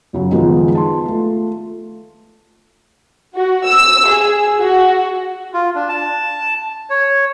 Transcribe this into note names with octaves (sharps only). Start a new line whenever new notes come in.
F#2 C#3 F#3
D#3 F3 G#3 B3 D#4
A5 C6
A3 F4
F#4
E6
G#4
F#4
F4
D4
A5
C#5